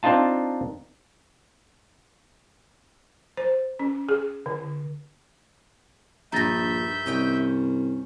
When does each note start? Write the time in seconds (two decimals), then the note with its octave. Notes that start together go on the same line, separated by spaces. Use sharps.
0.03 C4 D4 D#4 F4 A5
3.37 C5
3.79 C#4
4.09 G#4
4.46 D3
6.32 A#1 G2 D#3 E5 A#5 G6 A6 A#6
7.06 C2 C#4 D#5 G5